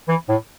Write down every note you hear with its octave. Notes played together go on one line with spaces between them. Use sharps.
E3
A2